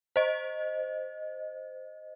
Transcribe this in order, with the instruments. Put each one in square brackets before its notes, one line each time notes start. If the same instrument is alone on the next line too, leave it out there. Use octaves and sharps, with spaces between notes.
[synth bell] C5 D#5